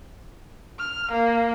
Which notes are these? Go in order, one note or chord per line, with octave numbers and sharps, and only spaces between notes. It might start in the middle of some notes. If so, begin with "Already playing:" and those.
F6
A#3